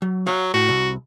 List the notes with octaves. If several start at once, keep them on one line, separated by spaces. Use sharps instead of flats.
F#3
F#3 F5 F#5
A2 F#4
C2